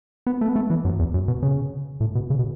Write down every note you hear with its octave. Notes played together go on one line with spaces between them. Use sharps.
B3
A3
B3
A3
E3
F#2
E2
F#2
B2
C#3
A2
B2
C#3
B2